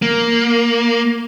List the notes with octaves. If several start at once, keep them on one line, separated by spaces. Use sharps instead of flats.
A#3